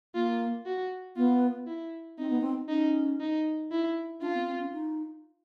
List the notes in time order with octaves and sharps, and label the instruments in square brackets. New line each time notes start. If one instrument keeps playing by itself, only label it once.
[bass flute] A#3 [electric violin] F4
[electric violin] F#4
[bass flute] B3 [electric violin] F4
[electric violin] E4
[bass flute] C4 [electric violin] D#4
[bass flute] B3
C4
[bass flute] C#4 [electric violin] D#4
[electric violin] D#4
E4
[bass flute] D4 [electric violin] F4
[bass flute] C4
C4
C#4
D#4